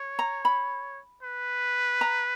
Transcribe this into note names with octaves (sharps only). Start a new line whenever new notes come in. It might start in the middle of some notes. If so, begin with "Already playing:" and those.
Already playing: C#5
A#5
B5
B4
A#5